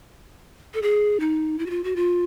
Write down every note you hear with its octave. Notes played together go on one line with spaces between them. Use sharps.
A4
G#4
D#4
E4
F#4
F4
F#4
F4